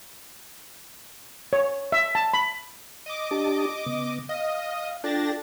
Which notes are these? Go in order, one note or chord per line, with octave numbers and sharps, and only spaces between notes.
C#5
E5
A5
B5
D#5 D6
D4 G4 A5
C#3 B3
D#5 F5
D4 F4 A4 G5 A6 A#6